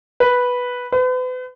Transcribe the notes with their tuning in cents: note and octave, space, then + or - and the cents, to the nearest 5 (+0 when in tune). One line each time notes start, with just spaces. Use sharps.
B4 -5
B4 +40